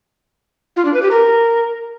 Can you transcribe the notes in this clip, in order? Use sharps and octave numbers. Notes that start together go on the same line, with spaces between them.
F4
D4
B4
G4
A#4